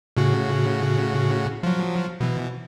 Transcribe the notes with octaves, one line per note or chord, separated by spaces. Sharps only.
A2 C#3 F#4
F3 F#3
B2 E3